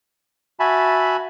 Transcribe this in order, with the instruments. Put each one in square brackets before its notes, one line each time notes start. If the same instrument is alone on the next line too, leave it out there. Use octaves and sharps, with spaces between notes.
[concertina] F#4 E5 G#5 A5 B5